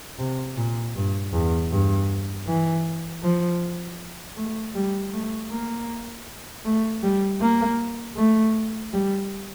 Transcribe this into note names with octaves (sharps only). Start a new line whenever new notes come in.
C3
A#2
G2
E2
G2
E3
F3
A3
G3
A3
A#3
A3
G3
A#3
A3
G3